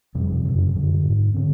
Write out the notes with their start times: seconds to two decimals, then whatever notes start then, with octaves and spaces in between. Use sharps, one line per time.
0.15 F2 C3 G3
0.45 F#2 C#3
0.75 F#2 D3
1.05 G#2
1.34 D3 C4